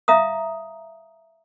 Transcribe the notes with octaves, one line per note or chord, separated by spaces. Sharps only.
E5 F5 A#5 D#6